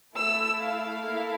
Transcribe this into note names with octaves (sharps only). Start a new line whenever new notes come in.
A3 E4 A4 E6
F5
A#3 E4 A4